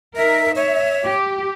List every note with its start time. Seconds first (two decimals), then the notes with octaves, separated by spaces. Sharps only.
0.16 D#4 A#4 E5
0.56 C#5 E5
1.04 G4